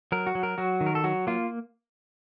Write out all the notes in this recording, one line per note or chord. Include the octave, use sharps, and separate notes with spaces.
F#3 A#4
F#4
F#3
A#4
F#3 F#4
D#3
A#4
A4
F#3 F#4
A#3 F4